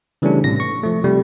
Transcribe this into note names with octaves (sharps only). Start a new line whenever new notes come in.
C#3 E3 G3 A3 C#4 D4
A2 C3 A#6
C#6
F3 A3
C3 G3 A3